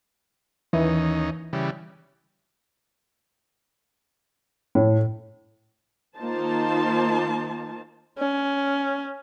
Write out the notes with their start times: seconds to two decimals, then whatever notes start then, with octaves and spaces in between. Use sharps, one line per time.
0.73 D#2 E3 C#4 D#4
1.53 C#3 E3 G3
4.75 A2
6.17 D#3 A#3 D#4 F4 C5 A5
8.19 C#4